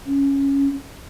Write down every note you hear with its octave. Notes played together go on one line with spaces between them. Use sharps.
C#4